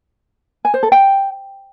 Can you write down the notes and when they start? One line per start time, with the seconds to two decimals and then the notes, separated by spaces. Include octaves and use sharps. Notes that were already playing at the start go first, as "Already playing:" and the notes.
0.65 G#5
0.74 C5
0.83 A4
0.92 G5